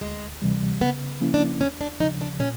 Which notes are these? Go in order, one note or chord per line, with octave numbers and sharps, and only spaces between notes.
D2 G#3
C3 E3 G3
C#3 B3
F3 A#3 C#4 E4
D4
D#2 C#4
D4
C#3 F3 D#4
D4
A#2 C#4